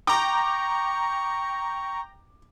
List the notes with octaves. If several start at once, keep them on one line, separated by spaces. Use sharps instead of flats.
G5 A#5 C#6 D6